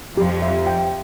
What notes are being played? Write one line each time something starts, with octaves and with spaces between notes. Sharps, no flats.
F2 F3 G4
E5
G5